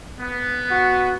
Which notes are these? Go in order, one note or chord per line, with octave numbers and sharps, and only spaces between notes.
B3
F#4